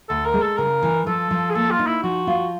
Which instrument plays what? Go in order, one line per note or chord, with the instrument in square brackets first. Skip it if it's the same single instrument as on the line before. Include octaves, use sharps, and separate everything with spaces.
[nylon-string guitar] D2 [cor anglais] A4
[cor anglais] A#4
[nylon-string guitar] G#3
[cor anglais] A4
[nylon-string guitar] C#3 [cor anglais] A#4
[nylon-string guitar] E3
[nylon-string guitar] F3 [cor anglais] A4
[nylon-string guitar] F3
[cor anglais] G#4
[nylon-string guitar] A#3 [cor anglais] A4
[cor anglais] F4
[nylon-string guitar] D#4
[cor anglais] E4
[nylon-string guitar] F3 [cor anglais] F#4
[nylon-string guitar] F4